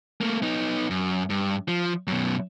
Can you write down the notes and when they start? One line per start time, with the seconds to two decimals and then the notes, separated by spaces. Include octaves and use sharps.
0.21 A3 A#3
0.42 B3 D#4
0.90 F#2
1.30 G2
1.68 F3
2.07 F#2 B2